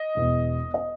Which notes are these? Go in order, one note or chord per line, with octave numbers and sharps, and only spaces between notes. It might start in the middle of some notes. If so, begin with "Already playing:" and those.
Already playing: D#5
E1 E2 B2
D#5